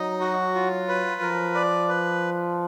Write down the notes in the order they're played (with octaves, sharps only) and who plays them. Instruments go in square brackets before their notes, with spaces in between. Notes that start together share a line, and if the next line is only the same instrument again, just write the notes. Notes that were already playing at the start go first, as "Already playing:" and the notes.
Already playing: [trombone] F#3 [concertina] D#4 D#5
[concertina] F#4
F4
B4
[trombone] F3 [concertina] A#4
[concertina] D5
B4